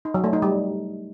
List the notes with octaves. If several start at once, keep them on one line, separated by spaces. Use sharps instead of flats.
D#4
F#3
A3
D#4
G3